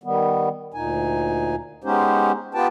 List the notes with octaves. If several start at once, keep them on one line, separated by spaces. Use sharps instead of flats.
D#3 G3 B3
D2 A#2 D#4 G#5
G#3 B3 C#4 D#4 G4 C5
B3 F4 G4 B4 G5 A5